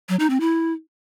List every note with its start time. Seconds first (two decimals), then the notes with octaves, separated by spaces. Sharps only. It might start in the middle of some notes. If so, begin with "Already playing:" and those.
0.09 F#3
0.19 D#4
0.30 C4
0.40 E4